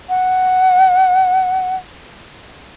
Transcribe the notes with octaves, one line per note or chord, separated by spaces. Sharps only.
F#5